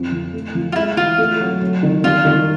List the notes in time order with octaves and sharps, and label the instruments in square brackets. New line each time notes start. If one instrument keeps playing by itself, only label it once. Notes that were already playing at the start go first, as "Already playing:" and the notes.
Already playing: [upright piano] F2 F#3
F3
A3
F3
[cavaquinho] F4
[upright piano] G#3 [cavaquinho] E4
[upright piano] E3 [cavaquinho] F4
[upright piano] A3
F#3
F#3
D#3
[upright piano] G3 [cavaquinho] F4
[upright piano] D#3